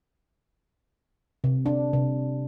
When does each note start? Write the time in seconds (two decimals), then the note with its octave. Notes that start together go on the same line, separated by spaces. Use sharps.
1.44 C3
1.66 D4
1.93 C3